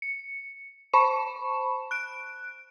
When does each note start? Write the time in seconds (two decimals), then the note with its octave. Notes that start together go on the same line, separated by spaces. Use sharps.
0.02 C#7
0.93 C5 A5 B5 C#6 E7
1.91 F#6 D7